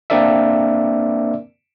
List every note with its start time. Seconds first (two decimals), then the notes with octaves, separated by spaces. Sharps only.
0.10 A#3 C4 D4 A#4 D5 E5